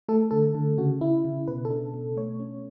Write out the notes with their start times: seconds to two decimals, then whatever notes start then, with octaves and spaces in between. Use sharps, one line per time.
0.09 A3 A4
0.31 D3 A4
0.55 D3
0.78 C#3 F#4
1.01 C#3 E4
1.25 C#3
1.48 B2 B4
1.65 A4
1.70 D4
1.94 B2
2.17 A3 C#5
2.40 C#4